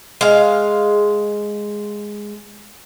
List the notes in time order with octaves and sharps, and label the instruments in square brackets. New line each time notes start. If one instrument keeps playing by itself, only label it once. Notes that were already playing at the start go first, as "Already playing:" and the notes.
[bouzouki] G#3 F5